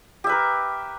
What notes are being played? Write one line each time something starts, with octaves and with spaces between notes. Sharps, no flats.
G4 A#4 B4 E5